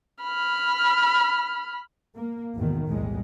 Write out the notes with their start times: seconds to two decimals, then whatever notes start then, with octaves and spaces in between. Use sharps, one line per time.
0.23 B5 F6
2.16 A#3
2.55 G#1 E2 B2 D#3
2.88 B1 E2 A2 G3 G#3